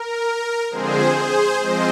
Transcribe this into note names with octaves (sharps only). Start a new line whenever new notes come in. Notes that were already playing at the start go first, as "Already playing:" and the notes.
Already playing: A#4
D3 F3 G#3 C4 G#4 C5
G#4 C5
F3 G#3 C4 C5 D#5